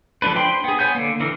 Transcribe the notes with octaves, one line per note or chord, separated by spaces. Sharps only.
F3 A3 D4 B4
D4 C5 G5 B5 C6
B3 G#4
B3 C#5 G#5 G6
D3 A#3
D3 E3 A#4